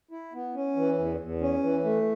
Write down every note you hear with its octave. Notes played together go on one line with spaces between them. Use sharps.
E4
B3
C#4
E3
E2
E2
C#4
E3
A3